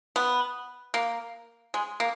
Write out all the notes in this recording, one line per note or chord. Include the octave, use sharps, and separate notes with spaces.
B3
A#3
G#3
A#3